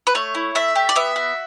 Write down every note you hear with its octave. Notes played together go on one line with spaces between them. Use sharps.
B4
A3 C#5
E4
A3 E5
G4
D5
B3 E5
F#4